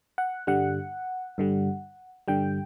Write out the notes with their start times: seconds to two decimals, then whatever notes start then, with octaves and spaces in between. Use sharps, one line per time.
0.18 F#5
0.47 G2 D3 G3 F#5
1.38 G2 D3 G3
2.28 G2 D3 G3 G5